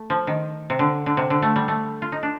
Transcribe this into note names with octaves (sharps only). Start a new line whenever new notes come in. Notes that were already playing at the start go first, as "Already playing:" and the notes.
Already playing: A3
F3
D#3
C3
D3
D3
C3
D3
A3
G3
A3
F4
D#4
D4